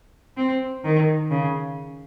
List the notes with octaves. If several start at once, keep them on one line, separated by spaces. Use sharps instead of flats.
C4
D#3
C#3